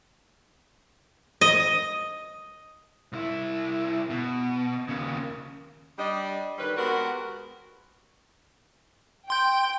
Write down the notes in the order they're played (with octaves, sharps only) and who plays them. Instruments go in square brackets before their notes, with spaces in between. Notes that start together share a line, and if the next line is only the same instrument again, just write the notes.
[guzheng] D#5
[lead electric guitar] C2 E4
B2
D#2 C#3
[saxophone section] G3 D4 D#5
D3 D#3 G3 C#4 B4
G#3 B3 C4 F#4 G4 A#4
[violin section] G5 [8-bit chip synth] C6 G6